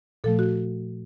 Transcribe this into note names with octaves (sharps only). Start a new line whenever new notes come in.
A#2 F3 A3 A4
F#4